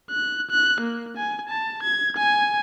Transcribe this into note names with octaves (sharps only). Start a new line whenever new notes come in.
F#6
F#6
A#3
G#5
A5
G#6
G#5